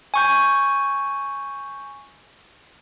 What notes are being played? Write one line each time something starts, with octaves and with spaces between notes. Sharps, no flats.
G#5 C#6 G6